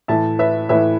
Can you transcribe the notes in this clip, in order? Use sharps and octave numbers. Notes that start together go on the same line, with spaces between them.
A2 E3 E5 A5
B4 E5
A2 E3 B4 E5